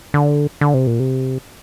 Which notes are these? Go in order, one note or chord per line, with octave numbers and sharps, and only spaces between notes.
D3
D3
C3
A#2
C3